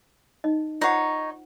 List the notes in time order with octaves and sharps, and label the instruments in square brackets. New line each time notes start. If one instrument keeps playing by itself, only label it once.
[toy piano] D#4 D#5
[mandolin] D#4 C#5 [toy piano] F4 C5 F#5